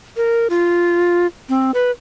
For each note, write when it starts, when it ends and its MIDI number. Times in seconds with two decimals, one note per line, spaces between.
0.17 0.48 70
0.50 1.26 65
1.49 1.71 60
1.74 1.91 71